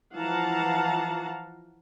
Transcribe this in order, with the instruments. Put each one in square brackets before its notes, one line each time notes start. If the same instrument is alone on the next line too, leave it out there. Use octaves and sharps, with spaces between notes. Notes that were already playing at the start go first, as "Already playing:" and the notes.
[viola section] E3 F3 F5 F#5 A5 A#5